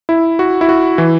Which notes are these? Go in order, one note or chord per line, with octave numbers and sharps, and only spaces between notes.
E4
F#4
E4
F#4
E3